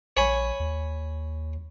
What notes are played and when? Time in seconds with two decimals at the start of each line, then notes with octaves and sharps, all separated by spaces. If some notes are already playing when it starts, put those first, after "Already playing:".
0.17 A#1 C#5 G#5 B5
0.60 D#2